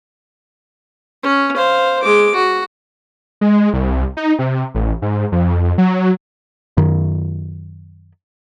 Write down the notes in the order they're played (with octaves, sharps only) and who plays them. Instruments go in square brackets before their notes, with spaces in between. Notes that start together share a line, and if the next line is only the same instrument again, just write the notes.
[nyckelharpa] C#4
C5 F5
G#3 D6
F#4
[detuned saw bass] G#3
C2
D#4
C3
A1
G#2
F2
F#3
[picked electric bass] F#2 D#3